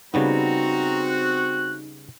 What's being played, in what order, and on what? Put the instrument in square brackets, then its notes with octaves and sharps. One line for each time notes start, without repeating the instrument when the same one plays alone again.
[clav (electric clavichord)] C#3 G3 B3 [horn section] C4 F#4 [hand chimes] D#4 [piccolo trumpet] A#5
[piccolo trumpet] F#6